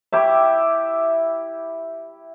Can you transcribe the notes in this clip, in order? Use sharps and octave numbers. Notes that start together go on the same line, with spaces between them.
E4 G4 E5